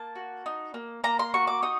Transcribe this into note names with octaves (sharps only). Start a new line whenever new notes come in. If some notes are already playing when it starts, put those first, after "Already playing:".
Already playing: A#3 A5
F#4
D#4
A#3
A#3 A#5
C6
F#4 C#6
D6
D#4 D#6